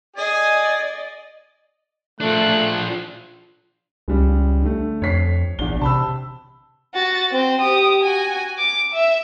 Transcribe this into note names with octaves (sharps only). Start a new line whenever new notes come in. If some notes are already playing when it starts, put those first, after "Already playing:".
G#4 D5 D#5 G#5
F3 A3 D4 F#6
C#2 C#3 G3 G#3
D3 A3
F2 C#5 B6 C7
A#1 E2 D4 G7
C3 A5 B5 E6
F#4 A6
C4 C5
G4 D#6
F#4 G#5
D6
E5